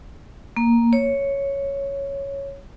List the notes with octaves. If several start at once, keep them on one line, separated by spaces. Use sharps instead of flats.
A#3
C#5